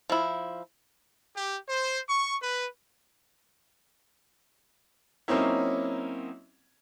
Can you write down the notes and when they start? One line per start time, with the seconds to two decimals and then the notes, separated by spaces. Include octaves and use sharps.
0.10 F3 E4
1.36 G4
1.68 C5
2.09 C#6
2.41 B4
5.28 F#3 A#3 C4 C#4 D#4 E4